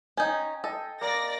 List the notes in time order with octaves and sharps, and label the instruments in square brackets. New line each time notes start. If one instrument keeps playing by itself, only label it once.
[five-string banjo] C#4 D#4 [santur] G5 G#5
[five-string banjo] A4 [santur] D#5
[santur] A#3 [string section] D5 A#6